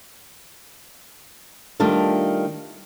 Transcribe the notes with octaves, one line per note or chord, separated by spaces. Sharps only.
D#3 G3 A3 D4 F4